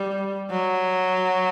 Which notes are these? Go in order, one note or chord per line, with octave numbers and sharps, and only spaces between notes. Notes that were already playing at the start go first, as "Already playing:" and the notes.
Already playing: G3
F#3